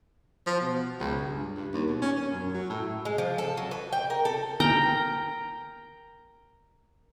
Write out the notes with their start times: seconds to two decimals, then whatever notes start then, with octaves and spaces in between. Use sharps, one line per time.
0.46 F3
0.61 B2
1.00 C#2
1.21 G2
1.56 G2
1.73 D#2
1.88 B2
2.02 C#4
2.17 C#4
2.32 F#2
2.54 F#3
2.70 A2
3.05 G#3
3.18 F3
3.38 A4
3.57 F#3
3.71 B4
3.93 G5
4.10 A#4
4.25 A4
4.60 A#4 G5 A#5